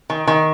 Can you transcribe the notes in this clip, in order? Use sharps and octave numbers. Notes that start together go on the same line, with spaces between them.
D#3
D#3